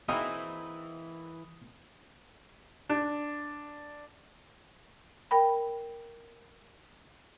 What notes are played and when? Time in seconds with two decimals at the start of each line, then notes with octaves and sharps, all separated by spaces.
0.09 E3 A#3 C4 D#4 E4 F#4 G#4 D#6
2.89 D4
5.31 A#4 G5 B5